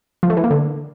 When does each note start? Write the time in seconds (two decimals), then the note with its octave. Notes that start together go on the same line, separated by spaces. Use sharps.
0.23 F3
0.30 A3
0.37 E3
0.44 A#3
0.51 D3